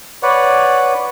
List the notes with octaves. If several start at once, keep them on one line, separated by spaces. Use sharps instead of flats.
B4 C#5 D5 F#5